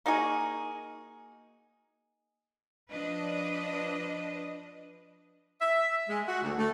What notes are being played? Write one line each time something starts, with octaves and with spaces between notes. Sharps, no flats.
A#3 D#4 F#4 G#4
F3 D4 B4 D#5
E5
G#3
F#4
D2
A3